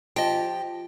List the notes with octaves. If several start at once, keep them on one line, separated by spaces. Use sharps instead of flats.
F3 G4 D#5 G5